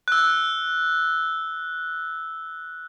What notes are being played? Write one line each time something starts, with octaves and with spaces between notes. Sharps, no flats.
E6 F#6